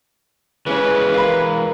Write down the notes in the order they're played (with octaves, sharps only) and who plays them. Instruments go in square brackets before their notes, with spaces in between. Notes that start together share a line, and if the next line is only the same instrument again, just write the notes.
[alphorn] C#3 [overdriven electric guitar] E3 G#3 [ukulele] C#4 C#5 [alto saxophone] B4
[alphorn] A#4 [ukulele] F5 B5